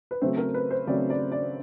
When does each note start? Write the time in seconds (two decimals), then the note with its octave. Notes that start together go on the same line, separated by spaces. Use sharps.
0.11 B4
0.22 C#3 F#3 A3 C4 C5
0.38 A#4
0.54 B4
0.71 C5
0.87 C#3 F#3 A3 C4 D5
1.10 D5
1.32 D5